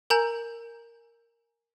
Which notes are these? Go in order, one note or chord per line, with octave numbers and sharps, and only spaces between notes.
A#4 G#5 A#5 G6